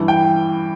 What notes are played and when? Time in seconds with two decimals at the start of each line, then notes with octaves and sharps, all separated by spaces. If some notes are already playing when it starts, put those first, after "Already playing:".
Already playing: G2 E3
0.08 G5